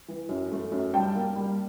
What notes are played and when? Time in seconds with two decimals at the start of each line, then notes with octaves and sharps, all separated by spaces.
0.08 E3
0.29 F#2
0.52 A3
0.72 F#2
0.94 G3 G5 A5
1.15 A#3
1.36 G3